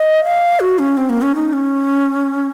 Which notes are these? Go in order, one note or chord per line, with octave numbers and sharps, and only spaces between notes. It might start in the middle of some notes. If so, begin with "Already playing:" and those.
Already playing: D#5
F5
F#4
C#4
C4
A#3
C#4
D#4
C#4